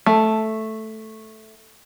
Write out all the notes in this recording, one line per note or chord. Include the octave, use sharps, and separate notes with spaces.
A3